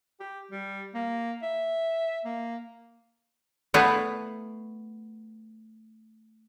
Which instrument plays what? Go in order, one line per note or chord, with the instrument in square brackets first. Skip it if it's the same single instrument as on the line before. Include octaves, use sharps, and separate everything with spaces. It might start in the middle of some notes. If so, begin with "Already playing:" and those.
[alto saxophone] G4
G3
A#3
E5
A#3
[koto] A3 B3 E4 B4 F5